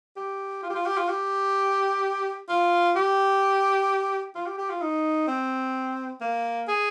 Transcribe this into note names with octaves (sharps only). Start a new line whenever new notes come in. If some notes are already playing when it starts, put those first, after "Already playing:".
G4
F4
G4
F4
G4
F4
G4
F4
G4
F4
G4
G4
F4
D#4
C4
A#3
G#4